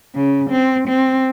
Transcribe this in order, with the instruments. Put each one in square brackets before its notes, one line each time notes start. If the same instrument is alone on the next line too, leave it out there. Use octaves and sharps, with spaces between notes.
[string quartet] C#3
C4
C4